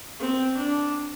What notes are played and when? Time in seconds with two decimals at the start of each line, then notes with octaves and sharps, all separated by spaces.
0.20 C4
0.57 D4